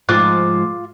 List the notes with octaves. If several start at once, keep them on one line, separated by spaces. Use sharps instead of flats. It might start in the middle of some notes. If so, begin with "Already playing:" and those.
G#2 F3 F4 D6 F#6